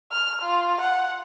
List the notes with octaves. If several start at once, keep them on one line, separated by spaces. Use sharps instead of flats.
F6
F4
F#5